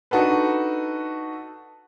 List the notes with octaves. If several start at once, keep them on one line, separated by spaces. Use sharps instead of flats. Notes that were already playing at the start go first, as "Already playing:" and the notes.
D4 D#4 F#4 A4 B4